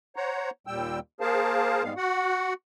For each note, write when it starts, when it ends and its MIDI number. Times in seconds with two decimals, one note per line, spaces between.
0.16 0.50 72
0.16 0.50 73
0.16 0.50 78
0.16 0.50 82
0.67 0.99 39
0.67 0.99 46
0.67 0.99 55
0.67 0.99 79
0.67 0.99 88
1.21 1.83 58
1.21 1.83 68
1.21 1.83 70
1.21 1.83 72
1.21 1.83 77
1.21 1.83 81
1.83 1.93 44
1.83 1.93 55
1.83 1.93 56
1.83 1.93 59
1.83 1.93 77
1.97 2.54 66
1.97 2.54 78